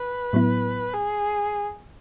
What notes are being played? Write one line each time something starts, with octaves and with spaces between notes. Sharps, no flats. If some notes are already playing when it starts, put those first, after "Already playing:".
Already playing: B4
A2 F#3 B3 E4
G#4